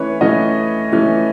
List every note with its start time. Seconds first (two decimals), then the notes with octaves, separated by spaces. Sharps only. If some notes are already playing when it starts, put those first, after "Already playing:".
Already playing: E3 A3 C#4 B4 C#5
0.21 E3 A3 C#4 D#5
0.92 E3 A3 C#4